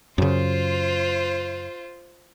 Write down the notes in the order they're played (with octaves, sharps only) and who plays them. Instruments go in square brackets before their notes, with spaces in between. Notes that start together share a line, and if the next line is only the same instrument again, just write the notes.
[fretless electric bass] F#2 C#3 [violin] F4 C5